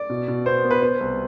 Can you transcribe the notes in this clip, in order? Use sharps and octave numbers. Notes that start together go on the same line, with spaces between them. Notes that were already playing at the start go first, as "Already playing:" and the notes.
Already playing: D5
B2
B2
B3 C5
B3
B4
B3 C5
C2